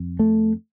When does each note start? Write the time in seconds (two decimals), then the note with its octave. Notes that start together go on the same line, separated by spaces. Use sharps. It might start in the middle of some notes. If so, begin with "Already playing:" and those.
Already playing: F2
0.19 A3